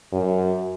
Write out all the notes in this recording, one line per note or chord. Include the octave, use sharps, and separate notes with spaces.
F#2